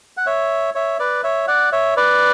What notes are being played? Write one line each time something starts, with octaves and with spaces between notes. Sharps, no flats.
F#5
C#5 E5
C#5 E5
B4 D5
C#5 E5
D5 F#5
C#5 E5
B4 D5